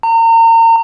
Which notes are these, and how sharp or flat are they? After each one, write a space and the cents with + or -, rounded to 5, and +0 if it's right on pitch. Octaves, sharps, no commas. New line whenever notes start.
A#5 -35